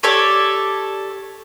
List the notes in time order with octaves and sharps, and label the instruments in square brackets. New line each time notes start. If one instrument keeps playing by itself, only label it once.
[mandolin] G4 A4 C#5 D5